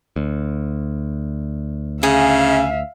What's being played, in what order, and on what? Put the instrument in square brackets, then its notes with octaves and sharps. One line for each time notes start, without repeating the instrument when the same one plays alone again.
[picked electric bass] D2
[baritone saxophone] C#3 [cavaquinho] G#4 [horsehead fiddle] E5 F5